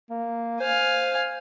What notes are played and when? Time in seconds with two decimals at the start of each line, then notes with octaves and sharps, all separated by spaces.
0.10 A#3
0.61 C5 F5 G#5